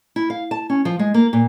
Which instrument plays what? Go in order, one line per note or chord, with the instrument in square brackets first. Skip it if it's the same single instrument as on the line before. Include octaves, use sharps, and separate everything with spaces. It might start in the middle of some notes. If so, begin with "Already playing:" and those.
[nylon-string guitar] E4
F5
A5
C#4
F3
G#3
A#3
A#2